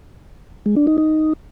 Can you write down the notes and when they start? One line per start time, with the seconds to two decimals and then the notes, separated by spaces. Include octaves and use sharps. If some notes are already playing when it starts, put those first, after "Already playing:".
0.66 G#3
0.76 D4
0.87 D#4
0.98 D#4